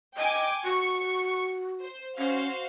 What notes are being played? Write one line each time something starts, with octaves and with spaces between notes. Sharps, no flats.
D#5 G5 G#5 D6
F#4 C#6
C5
C#4 F#4 C5 F5